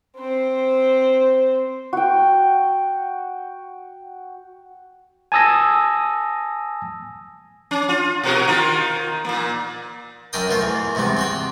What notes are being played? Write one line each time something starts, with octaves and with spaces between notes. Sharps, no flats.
C4 C5
F#4 G5
G#5 A5 D#6 E6 A#6
C#4
F4
B2 F#4 A#4
D#3 F4
A#2 A#3
F#2 D4 A#4 G5 D#6
B2 A3 F4 C5
E2 E3
E2 G#2 C3 G3 B3
C4 F#4 G5